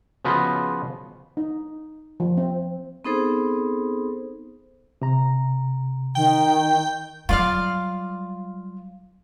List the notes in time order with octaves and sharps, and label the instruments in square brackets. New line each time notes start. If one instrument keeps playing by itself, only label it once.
[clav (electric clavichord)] C#3 F3 B3 F4 F#4 D#5
[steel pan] D#4
F3
C4
[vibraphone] B3 C4 D#4 G#4 A4 C5
[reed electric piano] C3 A#5
[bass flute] D#3 [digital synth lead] G5
[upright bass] F#3 G3 [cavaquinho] F4 D5 F5